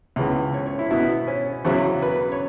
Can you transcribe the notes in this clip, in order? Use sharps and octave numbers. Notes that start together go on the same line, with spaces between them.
C#2 C#3 E3 B3
C#5
C#5
E4
B2 B3 E4
C#4
E2 C#3 F#3 E4
B4
C#5